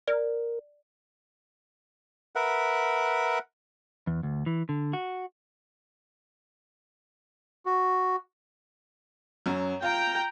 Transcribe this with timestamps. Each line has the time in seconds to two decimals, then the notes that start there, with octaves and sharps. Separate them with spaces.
0.07 A#4 D5
2.35 A#4 B4 E5 F#5
4.07 E2
4.23 D2
4.46 E3
4.69 D3
4.93 F#4
7.66 F#4
9.46 F#2 F#3
9.82 F4 G5 A#5